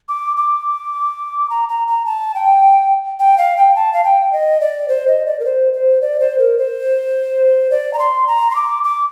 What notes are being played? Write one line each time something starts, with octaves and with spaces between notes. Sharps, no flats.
D6
D6
A#5
A#5
A#5
A5
G5
G5
F5
G5
A5
F5
G5
D#5
D5
C5
D#5
D5
A#4
C5
C5
D5
C5
A#4
C5
D5
A#5
C6
A#5
C6
D6
D6